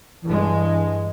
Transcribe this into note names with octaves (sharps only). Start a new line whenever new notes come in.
G2 E3 G#3